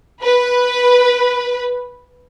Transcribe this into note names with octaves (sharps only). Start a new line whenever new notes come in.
B4